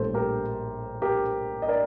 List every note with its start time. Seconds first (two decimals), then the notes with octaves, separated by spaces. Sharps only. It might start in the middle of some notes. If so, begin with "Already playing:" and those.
Already playing: A#1 A2 G3 A4 C5
0.14 G4 A#4
1.02 G4 A#4
1.62 D#5
1.68 A#4 D5